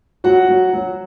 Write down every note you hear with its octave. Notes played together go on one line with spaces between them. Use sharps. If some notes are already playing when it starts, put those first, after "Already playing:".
F#3 F#4 F#5
F#3
F#3